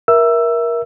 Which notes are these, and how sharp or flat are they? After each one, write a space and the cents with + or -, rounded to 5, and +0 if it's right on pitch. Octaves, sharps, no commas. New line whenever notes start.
A#4 +20 E5 +0 E6 +10